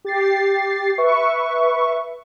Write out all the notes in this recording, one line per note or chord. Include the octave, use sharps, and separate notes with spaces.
G4 A6 C7
B4 E5 C#6